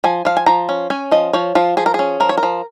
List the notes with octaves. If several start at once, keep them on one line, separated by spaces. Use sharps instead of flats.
F3 G#5
F3 F5
G#5
F3 A#5
C#4
C#4 G#5
F3 D#5
F3 C#5
F3 F4
F3 G#4
A#4
C#4 G#4
F3 A#4
C#5
A#4
F3